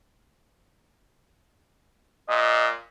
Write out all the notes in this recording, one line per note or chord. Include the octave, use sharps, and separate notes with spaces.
A#2 D#5